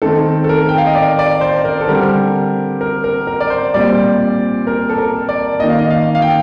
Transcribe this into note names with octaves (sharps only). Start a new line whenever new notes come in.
D#3 A3 C4 A4
A4
A#4
G5
F5
D#5
D5
D5
C5
A#4
A4
D3 G3 C4 A#4
A#4
A#4
A#4
D5
C5
A#2 G3 C4 D5
A#4
A4
A#4
D5
D#3 A#3 D#5
F5
D#5
F5
F5
G5